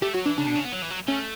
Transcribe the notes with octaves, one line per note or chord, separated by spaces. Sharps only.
A3 G4
F#3 F#4
E3 D4
C#3 D4
B2
C#3
B3
F#3
E3
F#3
A3 C#4